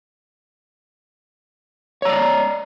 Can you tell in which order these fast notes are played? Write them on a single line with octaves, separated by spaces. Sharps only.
C#5 A#5 D5